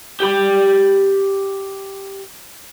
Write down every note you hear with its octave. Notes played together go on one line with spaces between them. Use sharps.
G4 B5